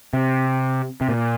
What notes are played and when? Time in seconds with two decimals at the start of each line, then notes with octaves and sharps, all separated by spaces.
0.13 C3
1.01 C3
1.09 A#2